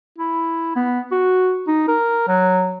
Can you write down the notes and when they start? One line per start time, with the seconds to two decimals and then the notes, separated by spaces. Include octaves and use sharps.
0.18 E4
0.76 B3
1.11 F#4
1.67 D#4
1.88 A#4
2.28 F#3